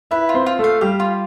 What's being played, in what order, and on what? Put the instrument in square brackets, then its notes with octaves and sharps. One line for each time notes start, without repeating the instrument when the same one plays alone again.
[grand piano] E4 E5 [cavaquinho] B4
[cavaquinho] F4
[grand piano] C4 C5
[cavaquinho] F4
[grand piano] A3 A4
[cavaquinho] F5
[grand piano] G3 G4 [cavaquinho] F5
[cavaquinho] F4